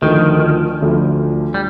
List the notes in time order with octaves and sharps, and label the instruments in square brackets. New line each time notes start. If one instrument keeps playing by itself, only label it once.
[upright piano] D2 D3 F3 [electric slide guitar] D#3
[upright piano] D2 D3 F3
[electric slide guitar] G3